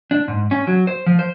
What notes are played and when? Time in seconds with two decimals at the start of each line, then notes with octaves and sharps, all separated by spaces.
0.11 D4
0.28 G#2
0.51 C#4
0.67 F#3
0.87 C5
1.06 F3
1.19 C5